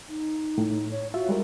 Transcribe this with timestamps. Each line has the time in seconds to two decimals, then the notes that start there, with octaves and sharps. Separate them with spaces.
0.09 D#4
0.58 A2
0.90 C#5
1.14 F4 F#4 E5
1.29 G3 G#3 A#4